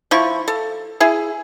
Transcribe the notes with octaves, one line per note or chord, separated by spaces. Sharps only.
F3 E4 C#6
A4
E4 G#4